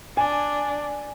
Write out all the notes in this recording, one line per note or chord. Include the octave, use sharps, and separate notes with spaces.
D4 G#5